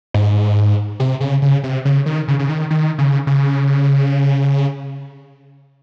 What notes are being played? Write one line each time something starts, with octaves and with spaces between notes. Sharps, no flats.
G#2
C3
C#3
C#3
C3
C#3
D#3
C#3
C#3
D#3
D#3
C#3
C#3